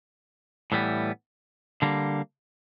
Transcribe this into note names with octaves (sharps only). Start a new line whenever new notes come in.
A2 E3 G3 B3
D3 G3 A#3